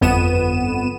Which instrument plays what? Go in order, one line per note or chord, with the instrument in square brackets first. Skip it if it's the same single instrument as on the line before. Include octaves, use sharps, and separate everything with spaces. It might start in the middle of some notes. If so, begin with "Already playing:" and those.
[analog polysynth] G1 F2 B3 D#7 E7